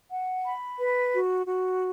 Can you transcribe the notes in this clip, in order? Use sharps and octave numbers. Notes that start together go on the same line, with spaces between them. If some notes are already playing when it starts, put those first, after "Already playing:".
F#5
B5
B4
F#4
F#4